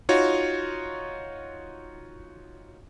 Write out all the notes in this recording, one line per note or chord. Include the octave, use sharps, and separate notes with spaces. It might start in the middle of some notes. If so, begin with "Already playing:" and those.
D#4 F4 F#4 C#5